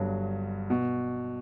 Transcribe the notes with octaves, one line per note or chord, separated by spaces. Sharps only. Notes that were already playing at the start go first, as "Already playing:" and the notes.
Already playing: G1 G2 F#3
B2